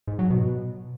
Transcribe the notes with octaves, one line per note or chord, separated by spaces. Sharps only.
G#2
F#3
B2